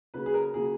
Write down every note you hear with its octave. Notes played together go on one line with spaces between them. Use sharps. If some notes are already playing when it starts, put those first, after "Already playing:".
C#3 F#3 A#3 B4
G#4
A#4
C#3 F#3 A#3 G#4